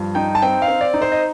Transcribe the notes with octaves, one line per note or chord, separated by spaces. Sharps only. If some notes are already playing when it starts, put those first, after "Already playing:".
Already playing: G2 F3
D#4 G5
A5
C4 G5
F5
C4
D5
D#4
C5
D#5